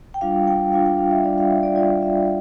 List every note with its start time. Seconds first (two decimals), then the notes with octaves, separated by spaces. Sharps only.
0.14 G5
0.21 G3 D4 F4 F5
0.47 G5
0.72 G3 D4 F4 F5
0.85 G5
0.98 F5
1.11 E5
1.24 G3 D4 F4 D5
1.38 F5
1.50 E5
1.63 D5
1.76 G3 D4 F4 D5
2.02 E5